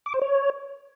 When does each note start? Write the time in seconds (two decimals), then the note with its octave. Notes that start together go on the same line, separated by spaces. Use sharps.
0.06 D6
0.14 C5
0.22 C#5